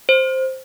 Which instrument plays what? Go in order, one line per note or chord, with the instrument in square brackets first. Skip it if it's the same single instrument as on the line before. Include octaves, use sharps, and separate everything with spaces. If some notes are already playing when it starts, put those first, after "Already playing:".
[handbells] C5